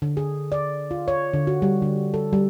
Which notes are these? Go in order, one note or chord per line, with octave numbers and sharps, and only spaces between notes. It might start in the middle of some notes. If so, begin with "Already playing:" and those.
D3
G#4
D5
F4
C#5
D3
F#4
G3
D3
A4
G3